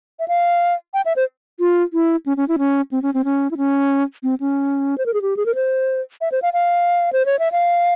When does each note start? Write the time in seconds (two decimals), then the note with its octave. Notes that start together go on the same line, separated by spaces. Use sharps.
0.19 E5
0.28 F5
0.94 G5
1.06 E5
1.16 C5
1.60 F4
1.93 E4
2.26 C#4
2.37 C#4
2.48 E4
2.59 C#4
2.92 C4
3.02 C#4
3.14 C4
3.25 C#4
3.51 E4
3.57 C#4
4.23 C4
4.40 C#4
4.98 C5
5.06 A#4
5.14 G#4
5.22 G4
5.37 G#4
5.46 A#4
5.55 C5
6.21 E5
6.32 C5
6.42 F5
6.53 F5
7.13 C5
7.26 C#5
7.39 E5
7.52 F5